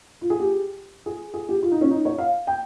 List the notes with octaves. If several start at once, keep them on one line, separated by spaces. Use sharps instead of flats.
F4
G#4
G4
G#4
G#4
G4
F4
D#4
C#4
D#4
C#5
F5
G5